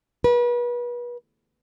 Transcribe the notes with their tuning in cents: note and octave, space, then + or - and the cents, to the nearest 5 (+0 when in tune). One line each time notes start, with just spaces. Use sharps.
B4 -35